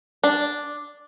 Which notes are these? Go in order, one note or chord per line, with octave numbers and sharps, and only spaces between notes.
D4